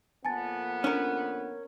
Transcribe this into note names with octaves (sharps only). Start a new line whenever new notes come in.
F2 A#2 B3 G#5 A5 A6
C#4 D4 A#4